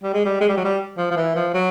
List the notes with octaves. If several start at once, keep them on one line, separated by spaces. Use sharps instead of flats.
G3
G#3
G3
G#3
G3
F#3
G3
F3
F3
E3
F3
F#3